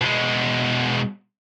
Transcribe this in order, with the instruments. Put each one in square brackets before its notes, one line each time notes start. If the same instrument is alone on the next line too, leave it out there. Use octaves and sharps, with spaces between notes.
[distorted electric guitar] B2 G#3